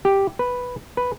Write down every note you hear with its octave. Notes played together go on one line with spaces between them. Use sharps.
G4
B4
B4